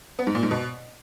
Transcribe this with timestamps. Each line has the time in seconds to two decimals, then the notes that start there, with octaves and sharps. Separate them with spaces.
0.19 B3
0.27 G#2
0.35 A#2
0.43 G#2
0.51 B2